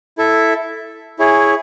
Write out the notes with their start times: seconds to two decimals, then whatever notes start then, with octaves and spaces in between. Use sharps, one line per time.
0.18 E4 A4 E5
1.19 E4 G#4 C#5